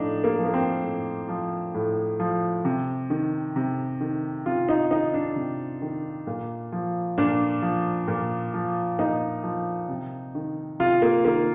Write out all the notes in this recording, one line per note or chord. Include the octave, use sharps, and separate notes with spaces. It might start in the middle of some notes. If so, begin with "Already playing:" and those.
Already playing: A2 F3 D4 D#4
A#3
F3
A#3
C4
A2
F3
A2
F3
C3
D#3
C3
D#3
C3 F4
D#4
D#3 D#4
D4
C3
D#3
A#2
F3
A#2 D4
F3
A#2
F3
A#2 D#4
F3
C3
D#3
C3 F4
A#3
D#3 A#3